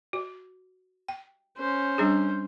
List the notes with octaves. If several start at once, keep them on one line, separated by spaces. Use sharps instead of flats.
F#4
G5
C#4 C5
G3 D4 G#4